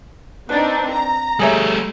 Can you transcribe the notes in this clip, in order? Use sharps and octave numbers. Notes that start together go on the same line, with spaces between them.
C4 D4 D#4 B4 D5
A#5
G3 A3 G#4 C#5 E5